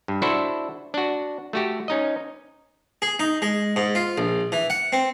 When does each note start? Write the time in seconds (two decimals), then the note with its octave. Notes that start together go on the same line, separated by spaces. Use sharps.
0.08 G2
0.22 D4 E4 F#4 A4 C5 E5
0.94 D4 F#4
1.53 A3 F#4 G4
1.88 C#4 D#4 D#5
3.02 G#4
3.19 D#4
3.42 G#3
3.76 G#2
3.95 F4
4.18 A#1
4.52 E3
4.70 F#5
4.92 C4